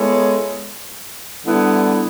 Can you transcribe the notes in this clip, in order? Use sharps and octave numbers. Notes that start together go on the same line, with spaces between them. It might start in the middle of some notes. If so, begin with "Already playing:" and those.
Already playing: G#3 B3 E4 A4 C#5
D3 G3 B3 E4